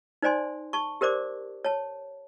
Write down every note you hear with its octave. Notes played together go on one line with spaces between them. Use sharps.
D#4 C5 D5 G#5 C6
A5 C#6
G4 A#4 C5 D5 D6
C#5 A5